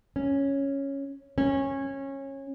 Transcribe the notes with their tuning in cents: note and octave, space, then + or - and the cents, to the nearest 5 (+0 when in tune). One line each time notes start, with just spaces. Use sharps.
C#4 -5
C#4 -20